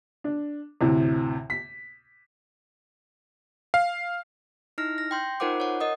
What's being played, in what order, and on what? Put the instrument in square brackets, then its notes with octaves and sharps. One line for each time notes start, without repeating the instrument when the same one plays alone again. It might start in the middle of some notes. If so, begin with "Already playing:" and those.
[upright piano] D4
D2 A2 C3
B6
[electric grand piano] F5
[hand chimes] D#4 E4 F6 A#6
A#6
G5 C6 G6
D#4 F4 A#4 C5 F#5 D6
C#5 F#5
A#4 D#5 D#6